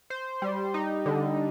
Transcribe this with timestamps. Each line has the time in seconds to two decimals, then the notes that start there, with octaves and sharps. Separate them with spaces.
0.10 C5
0.42 G3
0.74 D#4
1.06 D3